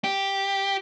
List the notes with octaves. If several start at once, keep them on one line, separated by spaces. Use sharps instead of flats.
G4